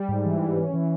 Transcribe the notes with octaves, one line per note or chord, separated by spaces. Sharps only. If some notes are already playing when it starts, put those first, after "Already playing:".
Already playing: G3
G#2
E3
E3
C#4
E3